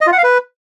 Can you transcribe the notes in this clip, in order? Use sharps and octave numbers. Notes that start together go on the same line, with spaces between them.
D#5
F4
F#5
F5
B4